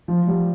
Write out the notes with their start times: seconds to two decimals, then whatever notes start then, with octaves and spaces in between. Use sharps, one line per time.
0.08 F3
0.27 G3